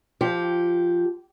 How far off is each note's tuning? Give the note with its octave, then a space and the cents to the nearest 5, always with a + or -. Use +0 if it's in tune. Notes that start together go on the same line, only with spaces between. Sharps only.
F3 -5 G4 -5